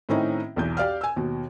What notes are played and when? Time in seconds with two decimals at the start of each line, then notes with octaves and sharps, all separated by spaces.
0.09 A2 D#3 C4 C#4 D#4 E4
0.56 B1 E2 G6
0.77 G4 D5 F5 F6
1.01 G#5 E6
1.16 D#2 B2